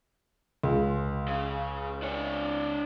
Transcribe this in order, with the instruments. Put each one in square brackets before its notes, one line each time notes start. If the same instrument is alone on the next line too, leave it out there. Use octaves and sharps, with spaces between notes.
[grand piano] C#2
[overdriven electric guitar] C#3
D4 C#5